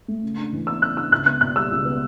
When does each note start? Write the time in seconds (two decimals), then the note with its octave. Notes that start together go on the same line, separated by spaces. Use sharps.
0.08 A3
0.22 C#3
0.38 D4
0.53 E3
0.67 B3 E6
0.82 C#3 F#6
0.97 D4 E6
1.11 C#2 F#6
1.26 B3 F#6
1.41 B2 F#6
1.56 G3 E6
1.71 C#2
1.85 B3